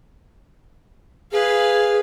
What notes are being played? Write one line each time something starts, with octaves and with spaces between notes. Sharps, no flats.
G#4 B4 F5